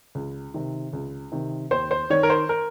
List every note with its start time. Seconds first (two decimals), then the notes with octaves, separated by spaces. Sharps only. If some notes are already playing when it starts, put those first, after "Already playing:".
0.15 C#2
0.54 C3 D#3
0.93 C#2
1.32 C3 D#3
1.71 D#2 C5
1.91 C5
2.10 D#3 C#5
2.23 A#4
2.30 C5
2.49 A#4